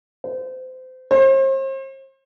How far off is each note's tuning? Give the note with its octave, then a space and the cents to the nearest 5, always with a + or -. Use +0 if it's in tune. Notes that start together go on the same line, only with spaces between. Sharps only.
C5 -30
C5 +40